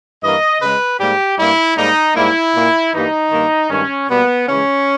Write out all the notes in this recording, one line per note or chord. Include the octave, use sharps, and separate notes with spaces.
G2 E3 A#3 D#5
C#3 G#3 B4
G#2 G3 A#3 G4
G2 G3 A#3 E4
G#2 G3 A#3 D#4
G#2 G3 A#3 E4
A#2 A#3
G2 E3 G3 A#3 D#4
G2 D#3 A#3
G2 D#3 G#3 C#4
B2 G3 A#3 B3
C#3 E3 G#3 C#4